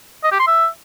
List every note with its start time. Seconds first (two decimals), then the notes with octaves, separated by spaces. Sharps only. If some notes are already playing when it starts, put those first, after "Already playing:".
0.24 D#5
0.32 G4
0.40 C6
0.47 E5